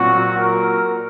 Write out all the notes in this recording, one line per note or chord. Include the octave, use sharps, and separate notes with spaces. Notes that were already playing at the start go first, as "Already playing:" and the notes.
Already playing: A#2 F#3 C4 F#4
A#4